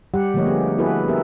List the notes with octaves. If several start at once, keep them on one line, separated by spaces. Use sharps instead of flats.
G3 G4 F#5
D3 F3 A3 A#3 C#5 D#5
B3 G4 G#4
B3 E4 F#4 G#4 A4 B4
B3 G4 A#4 E5